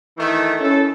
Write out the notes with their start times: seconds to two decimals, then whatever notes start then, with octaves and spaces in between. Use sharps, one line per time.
0.18 D#3 E3 A3
0.61 C#4 E4 A4